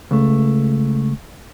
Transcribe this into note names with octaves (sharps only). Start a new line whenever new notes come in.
C#2 A3